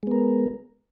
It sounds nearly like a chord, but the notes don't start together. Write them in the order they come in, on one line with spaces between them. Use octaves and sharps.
G#3 B3 A#4